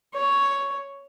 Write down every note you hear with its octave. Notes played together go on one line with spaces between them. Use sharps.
C#5